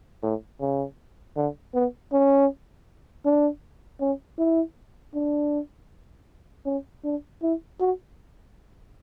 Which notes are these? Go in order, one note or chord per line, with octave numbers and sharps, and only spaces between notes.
A2
C#3
D3
B3
C#4
D4
C#4
E4
D4
C#4
D4
E4
F#4